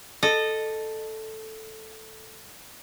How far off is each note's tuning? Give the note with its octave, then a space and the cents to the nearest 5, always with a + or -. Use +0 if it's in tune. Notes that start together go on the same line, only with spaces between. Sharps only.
A4 +0 D#5 -20